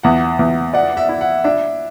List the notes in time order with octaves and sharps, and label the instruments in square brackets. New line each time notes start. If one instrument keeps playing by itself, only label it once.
[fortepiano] E2 [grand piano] F#5
[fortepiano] E2
[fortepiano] D5 [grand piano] F#5
[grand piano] E5
[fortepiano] E4
[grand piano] F#5
[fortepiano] D4 [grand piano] E5